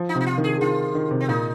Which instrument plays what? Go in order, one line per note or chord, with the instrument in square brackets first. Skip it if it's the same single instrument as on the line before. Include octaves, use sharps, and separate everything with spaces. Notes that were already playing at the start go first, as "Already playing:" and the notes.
Already playing: [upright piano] F3
[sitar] D#4
[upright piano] C3
[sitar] D#4
F4
[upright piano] D#3
[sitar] G#4
[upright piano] D#3 [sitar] F4
[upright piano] D#3
C3
[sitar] C4
[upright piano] A#2 [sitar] D#4